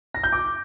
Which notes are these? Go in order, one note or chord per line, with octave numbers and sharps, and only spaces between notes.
A#6
G6
D6